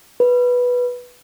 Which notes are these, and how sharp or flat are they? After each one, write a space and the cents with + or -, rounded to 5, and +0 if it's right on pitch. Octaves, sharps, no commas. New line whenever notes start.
B4 -5